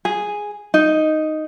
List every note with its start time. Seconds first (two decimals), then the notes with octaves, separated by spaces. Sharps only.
0.05 G#4
0.74 D#4